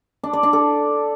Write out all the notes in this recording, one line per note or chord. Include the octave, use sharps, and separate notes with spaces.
D4
D5
D4
A4